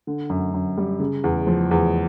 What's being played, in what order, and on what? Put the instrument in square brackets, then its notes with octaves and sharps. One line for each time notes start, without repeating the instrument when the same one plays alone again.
[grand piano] D3
F#2
F#2
G3
C#3
E2
F3
E2